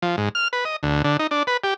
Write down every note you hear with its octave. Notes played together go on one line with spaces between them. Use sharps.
F3
G#2
F6
B4
D#5
D2
D3
D#4
D4
B4
G4